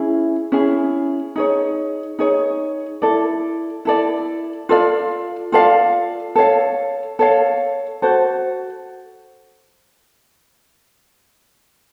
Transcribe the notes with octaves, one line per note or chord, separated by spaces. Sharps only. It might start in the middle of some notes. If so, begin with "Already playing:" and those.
Already playing: C#4 E4 G#4
C#4 E4 G#4
D#4 G#4 C#5
D#4 G#4 C#5
E4 A4 D5
E4 A4 D5
F4 A4 D5 F5
F4 A4 D5 F5
A4 C#5 F5
A4 C#5 F5
F#4 A4 C5